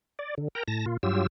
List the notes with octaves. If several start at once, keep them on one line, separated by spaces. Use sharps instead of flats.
D5
D3
A#4 G5 A#5
A2 A5 A#6
A#2 F4
G2 F#3 F4 G4 E6